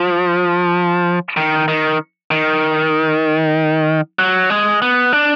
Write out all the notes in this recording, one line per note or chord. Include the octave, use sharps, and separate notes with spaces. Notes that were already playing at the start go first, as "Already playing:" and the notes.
Already playing: F3
D#3
D#3
D#3
F#3
G#3
B3
D4